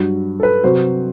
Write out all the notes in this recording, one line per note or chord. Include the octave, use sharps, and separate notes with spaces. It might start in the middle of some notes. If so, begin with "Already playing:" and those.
Already playing: G2 F#3
A4
B4
C3 F#3 C5